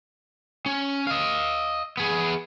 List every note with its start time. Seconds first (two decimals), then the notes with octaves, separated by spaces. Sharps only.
0.66 C#4
1.07 D#5 F5
1.97 B3 G#4